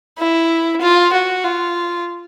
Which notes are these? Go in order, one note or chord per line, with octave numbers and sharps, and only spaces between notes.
E4
F4
F#4
F4